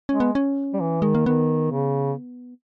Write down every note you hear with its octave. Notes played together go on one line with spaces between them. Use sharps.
G#3 C#4
B3
C#4
G3
E3
D#3 G#3
A#3
D#3 B3
C#3